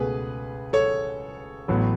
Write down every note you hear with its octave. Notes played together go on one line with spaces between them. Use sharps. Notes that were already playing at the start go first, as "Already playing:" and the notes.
Already playing: C#2 B2 A3 G#4 B4
A4 C#5
A1 A2 F#3 B3